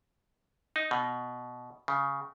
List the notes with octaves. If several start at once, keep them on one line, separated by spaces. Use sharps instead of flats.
D#4
B2
C#3